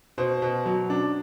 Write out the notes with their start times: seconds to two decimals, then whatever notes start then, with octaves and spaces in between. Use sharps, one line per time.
0.18 B2 C5
0.42 B2
0.66 F#3
0.90 D4